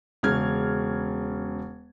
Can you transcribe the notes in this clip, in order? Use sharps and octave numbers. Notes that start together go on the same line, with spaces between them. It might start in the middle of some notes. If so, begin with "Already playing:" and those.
E1 C#3 F6 G#6